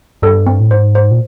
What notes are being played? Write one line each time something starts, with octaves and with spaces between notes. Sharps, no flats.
G2 A4
C4
A2
G#2 C5
C5
A#2